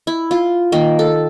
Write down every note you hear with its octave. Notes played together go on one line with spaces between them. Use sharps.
E4
F4
D#3 A#3
A4